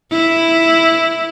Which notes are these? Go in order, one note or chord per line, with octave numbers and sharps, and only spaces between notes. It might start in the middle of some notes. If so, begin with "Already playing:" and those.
E4